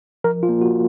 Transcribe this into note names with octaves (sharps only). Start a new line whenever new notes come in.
F3 A#4
F4
A#3
F#4